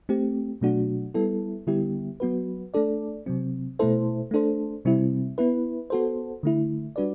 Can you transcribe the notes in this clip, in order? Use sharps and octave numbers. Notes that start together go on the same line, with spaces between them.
A3 C4 G4
B2 F#3 A3 D4 F#4
G3 B3 E4 A4
D3 G3 B3 E4 G4
F#3 B3 F#4 B4
A3 D4 A4 D5
C3 F#3 C4
B2 A3 E4 A4 C5
A3 D4 A4 C5
C3 G3 C4 E4
B3 E4 B4
B3 F#4 A4 C5
D3 A3 E4
G3 D4 F#4 B4 D5